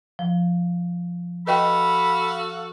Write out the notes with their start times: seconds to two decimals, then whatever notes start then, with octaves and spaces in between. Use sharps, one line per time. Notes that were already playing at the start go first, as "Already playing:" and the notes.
0.19 F3
1.47 F#4 A4 B4 D#5 F5 G5 B5